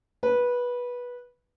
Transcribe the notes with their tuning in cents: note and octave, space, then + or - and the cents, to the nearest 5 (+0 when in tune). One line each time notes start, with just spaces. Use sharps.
B4 -15